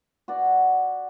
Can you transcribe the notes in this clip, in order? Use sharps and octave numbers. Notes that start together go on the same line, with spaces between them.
F#4 D5